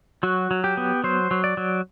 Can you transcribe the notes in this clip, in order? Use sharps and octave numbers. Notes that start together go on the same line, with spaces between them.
F#3 F#4
F#3
G4
B3
F#3 C5
F#3
D5
F#3